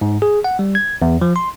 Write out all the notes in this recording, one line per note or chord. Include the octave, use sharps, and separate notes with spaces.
G#2
G#4
F#5
G3
G#6
E2
F3
C6